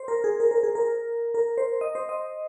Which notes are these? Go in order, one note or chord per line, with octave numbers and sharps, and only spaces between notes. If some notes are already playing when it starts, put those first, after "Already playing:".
Already playing: C5
A#4
G#4
A#4
A#4
G#4
A#4
A#4
C5
D#5
C5
D#5